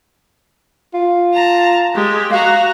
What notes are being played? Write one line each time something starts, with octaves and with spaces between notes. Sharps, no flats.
F4
A5 A#5
G#3 G4
F#4 F5 A#5